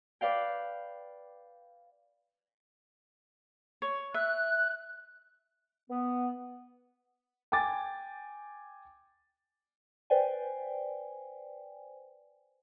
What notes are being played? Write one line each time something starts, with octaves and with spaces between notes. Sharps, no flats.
B4 D5 F5 G5
C#5
E5 F#6
B3
G5 G#5 D6 A6
B4 C5 D5 G5 G#5